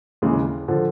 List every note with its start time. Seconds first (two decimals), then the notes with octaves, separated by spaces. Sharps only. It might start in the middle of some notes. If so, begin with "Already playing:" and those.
0.22 D#2 C#3 E3 G#3
0.68 D3 F3